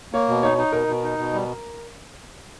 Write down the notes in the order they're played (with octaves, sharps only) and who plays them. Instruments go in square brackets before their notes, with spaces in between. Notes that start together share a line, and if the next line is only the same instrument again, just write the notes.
[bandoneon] A#3 [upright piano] C#5
[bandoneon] B2
[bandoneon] D#4 [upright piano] C#5
[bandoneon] D#4
[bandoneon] B2 [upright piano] A#4
[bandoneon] B2
D#4
B2
G3